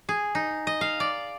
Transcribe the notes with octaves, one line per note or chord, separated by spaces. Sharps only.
G#4
D#4
D#5
F5
D5